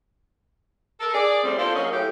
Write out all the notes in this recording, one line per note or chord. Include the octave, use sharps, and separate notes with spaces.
A4 A#4
G#4 D5
A2 G3 C4
A#3 D4 F4 A4 C5
F#3 A#3 C#4 G#4 D#5 F5
A2 G4